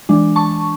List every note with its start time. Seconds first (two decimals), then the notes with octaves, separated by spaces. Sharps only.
0.09 E3 G#3 D4
0.36 A5 C#6